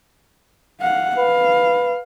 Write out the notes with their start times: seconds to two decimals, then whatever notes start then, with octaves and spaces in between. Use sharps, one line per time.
0.81 F5 F#5
1.17 B4 F5